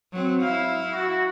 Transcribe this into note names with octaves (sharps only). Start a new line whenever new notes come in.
F#3 C4
E4 F5
F#4